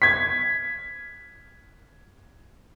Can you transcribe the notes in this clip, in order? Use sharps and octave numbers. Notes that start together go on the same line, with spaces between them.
G#6 B6